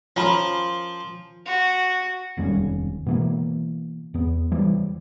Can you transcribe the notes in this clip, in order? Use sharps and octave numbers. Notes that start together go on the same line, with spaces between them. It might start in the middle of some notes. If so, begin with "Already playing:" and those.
F3 C#4 A#4 B5
F#4
F1 D#2 G3 C#4
B2 E3 A#3
E2 B3
E3 G3